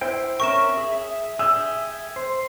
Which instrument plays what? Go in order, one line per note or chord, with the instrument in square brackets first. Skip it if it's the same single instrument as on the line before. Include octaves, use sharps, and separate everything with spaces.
[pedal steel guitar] E4 C5 G5
[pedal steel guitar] C#4 A#4 G5 [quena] E5 [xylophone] C#6 E7
[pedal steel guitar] G#4
[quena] E5
[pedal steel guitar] G#4 G5 [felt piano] E6
[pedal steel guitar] C5